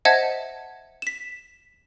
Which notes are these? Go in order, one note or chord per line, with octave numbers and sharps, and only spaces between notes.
C5 D#5 E5 F#5 A5 G#6
B6 E7